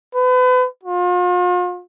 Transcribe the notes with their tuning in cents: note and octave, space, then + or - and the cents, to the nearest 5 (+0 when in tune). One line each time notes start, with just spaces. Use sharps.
B4 +35
F4 +40